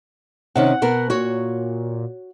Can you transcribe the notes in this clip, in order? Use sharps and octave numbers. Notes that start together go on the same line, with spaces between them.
C3 D#3 C#4 F#5
B2 B3 A#4
A#2 F#4 C#5